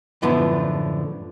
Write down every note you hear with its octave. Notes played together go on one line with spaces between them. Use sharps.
F#2 A2 D3 F3 B3 E4